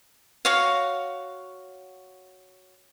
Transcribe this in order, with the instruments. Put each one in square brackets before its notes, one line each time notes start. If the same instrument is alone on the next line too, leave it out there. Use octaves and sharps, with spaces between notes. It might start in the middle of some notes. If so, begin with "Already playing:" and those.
[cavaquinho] F#4 C#5 F5